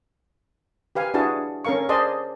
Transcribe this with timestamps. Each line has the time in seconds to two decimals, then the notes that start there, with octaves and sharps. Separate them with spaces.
0.95 G4 B4 F5 G#5
1.14 D4 E4 F#4 G#4 B4 A5
1.65 C#4 A4 A#4 F5 C#6
1.89 G#4 C5 D5 D#5 A5 C6